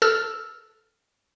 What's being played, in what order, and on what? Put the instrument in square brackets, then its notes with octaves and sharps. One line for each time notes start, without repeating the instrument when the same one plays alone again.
[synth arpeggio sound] A4 E6 F6